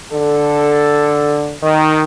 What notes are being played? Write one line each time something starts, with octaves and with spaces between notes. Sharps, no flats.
D3 A4
D#3